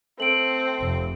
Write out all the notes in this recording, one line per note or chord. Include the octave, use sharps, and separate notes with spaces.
A3 C4 D7 F#7
F1